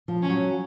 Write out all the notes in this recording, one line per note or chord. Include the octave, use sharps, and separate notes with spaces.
F3
C#4
F#3